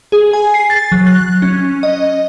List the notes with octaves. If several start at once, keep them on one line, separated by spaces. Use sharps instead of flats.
G#4
G#5
C7
A6
F#3
F#6
C#4
D#5